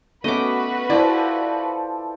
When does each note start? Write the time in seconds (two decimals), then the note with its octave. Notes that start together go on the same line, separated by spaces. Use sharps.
0.24 A3 B3 C#4 F#4 B4 D#5 D6
0.90 E3 F3 E4 A4 C5 D5